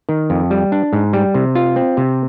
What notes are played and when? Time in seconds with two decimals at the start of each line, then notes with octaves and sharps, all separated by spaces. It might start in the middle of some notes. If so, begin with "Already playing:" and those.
0.09 D#3
0.30 F2
0.51 G3
0.72 D4
0.93 G#2
1.13 G3
1.35 C3
1.55 F4
1.76 C4
1.97 C3